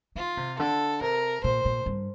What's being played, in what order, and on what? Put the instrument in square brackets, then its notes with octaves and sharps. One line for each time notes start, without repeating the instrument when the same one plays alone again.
[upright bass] D#3 [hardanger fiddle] F4
[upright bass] C3
[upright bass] D3 [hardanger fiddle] A4
[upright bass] C3 [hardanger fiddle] A#4
[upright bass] A#2 [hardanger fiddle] C5
[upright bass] A#2
G2